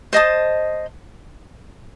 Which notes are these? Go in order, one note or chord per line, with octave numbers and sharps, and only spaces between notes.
C5 D#5 A5 D#6